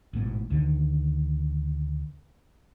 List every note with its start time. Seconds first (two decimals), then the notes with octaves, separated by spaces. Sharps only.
0.13 A1 G#2 B2
0.50 D2 D3 D#3